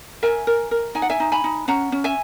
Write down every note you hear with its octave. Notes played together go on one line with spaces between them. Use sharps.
A#4 E5 G#5
A#4
A#4
D#4 G#5
F#5
E5 G#5
D#4
G#5 B5
D#4
C#4 F#5 A#5
C#4
E5 G#5